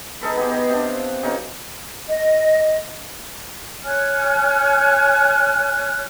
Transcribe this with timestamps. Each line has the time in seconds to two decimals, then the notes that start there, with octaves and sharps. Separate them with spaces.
0.21 D#4 G#4 A4 B4
0.36 B3 D#4 G4 G#4
0.51 G4 D#5
0.70 C3 D4
0.83 F5
1.23 B2 C#4 D#4 G#4
2.09 D#5
3.85 C#5 G#5 F6 F#6